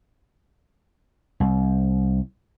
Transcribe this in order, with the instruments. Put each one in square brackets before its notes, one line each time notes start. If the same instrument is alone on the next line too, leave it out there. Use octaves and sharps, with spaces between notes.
[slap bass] C2